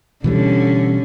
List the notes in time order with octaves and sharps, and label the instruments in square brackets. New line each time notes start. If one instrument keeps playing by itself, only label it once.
[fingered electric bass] B2 E3 G3 [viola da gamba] D3 C#4